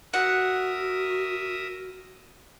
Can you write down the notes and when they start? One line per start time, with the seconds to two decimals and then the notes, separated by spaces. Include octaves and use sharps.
0.13 F#4 A#4 E5 F#5 D#6